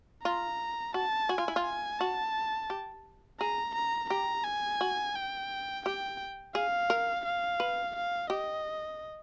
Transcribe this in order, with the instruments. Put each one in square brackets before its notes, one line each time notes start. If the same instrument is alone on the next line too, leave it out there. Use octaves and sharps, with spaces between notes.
[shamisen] F4 [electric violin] A#5
[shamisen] F#4 [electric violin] A5
[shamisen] F#4 [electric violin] G#5
[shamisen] F4
E4
F4
[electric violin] G#5
[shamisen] F#4 [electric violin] A5
[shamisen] G4
[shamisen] G#4 [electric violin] A#5
[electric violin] A#5
[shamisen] G4 [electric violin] A#5
[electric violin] G#5
[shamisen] F#4
[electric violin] G5
[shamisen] G4 [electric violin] G5
[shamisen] G#4 [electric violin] F5
[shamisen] A#4
[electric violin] F5
[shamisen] B4
[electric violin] F5
[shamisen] G4 [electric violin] D#5